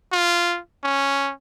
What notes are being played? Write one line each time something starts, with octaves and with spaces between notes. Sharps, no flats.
F4
C#4